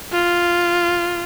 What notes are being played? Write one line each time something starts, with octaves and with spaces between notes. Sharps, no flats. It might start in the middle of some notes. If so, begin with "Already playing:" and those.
F4